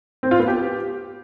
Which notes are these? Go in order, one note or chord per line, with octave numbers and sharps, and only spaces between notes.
C4
F4
B3
G4